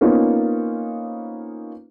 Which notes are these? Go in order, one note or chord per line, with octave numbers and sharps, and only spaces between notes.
A#3 B3 C#4 D#4 F4 C5